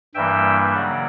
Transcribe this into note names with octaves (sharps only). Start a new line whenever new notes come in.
G2 E3 G3 A#3 E5 G5
C#3 F#3 A#3 D5 F#5